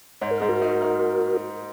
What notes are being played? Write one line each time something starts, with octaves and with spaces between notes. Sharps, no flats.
G#2 C#5
A#4
G#2 G#4
F#4 A#4
D#4
D#4